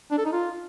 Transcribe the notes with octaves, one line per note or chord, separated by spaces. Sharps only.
D4
A4
D#4
F4